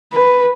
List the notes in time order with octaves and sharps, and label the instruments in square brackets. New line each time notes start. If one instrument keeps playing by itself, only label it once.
[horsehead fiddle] B4